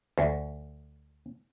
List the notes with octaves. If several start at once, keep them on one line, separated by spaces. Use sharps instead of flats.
D2